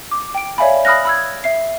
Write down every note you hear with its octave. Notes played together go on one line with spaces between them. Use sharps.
D6
G5 D7
C#5 D5 E5 F5 G#5 B5
B5 D#6 F6 F#6 A#6
B5 E6 G#6
E5 C7